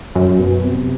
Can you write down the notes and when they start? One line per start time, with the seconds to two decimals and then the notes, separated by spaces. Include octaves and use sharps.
0.15 F#2
0.40 B2
0.64 C3